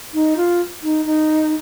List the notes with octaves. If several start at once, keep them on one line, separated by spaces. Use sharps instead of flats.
D#4
F4
D#4
D#4